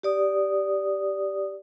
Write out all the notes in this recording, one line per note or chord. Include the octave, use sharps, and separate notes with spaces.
G4 D5 D#6